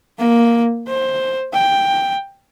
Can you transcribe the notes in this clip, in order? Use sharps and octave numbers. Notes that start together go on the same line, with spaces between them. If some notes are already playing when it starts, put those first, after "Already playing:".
A#3
C5
G5